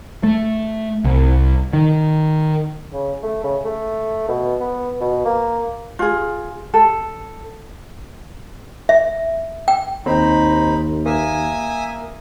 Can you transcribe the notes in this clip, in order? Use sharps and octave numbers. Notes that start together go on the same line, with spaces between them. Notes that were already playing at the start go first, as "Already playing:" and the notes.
A3
C2
D#3
C#3
A3
C#3
A3
B2
B3
B2
A#3
F4 G#4
A4
E5
G5
D#2 C4 D#4 B5
A#3 E5 G#5 D#6